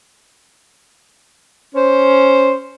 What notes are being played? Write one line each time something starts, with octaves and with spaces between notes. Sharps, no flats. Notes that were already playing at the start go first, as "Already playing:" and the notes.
C#4 C5